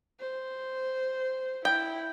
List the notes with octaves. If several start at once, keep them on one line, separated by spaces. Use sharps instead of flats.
C5
E4 G5